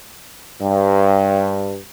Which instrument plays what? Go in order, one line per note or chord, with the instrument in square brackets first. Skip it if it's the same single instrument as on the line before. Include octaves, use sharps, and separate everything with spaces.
[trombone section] G2